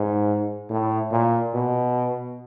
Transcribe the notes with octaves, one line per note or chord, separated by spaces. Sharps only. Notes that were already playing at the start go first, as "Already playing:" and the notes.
Already playing: G#2
A2
A#2
B2